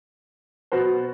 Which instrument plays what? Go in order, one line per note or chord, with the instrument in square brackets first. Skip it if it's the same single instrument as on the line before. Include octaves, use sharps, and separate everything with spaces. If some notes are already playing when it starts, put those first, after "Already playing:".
[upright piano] B2 F#3 B3 F#4 C5